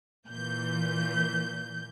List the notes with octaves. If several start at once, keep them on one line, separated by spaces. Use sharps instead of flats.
A#2 E3 G6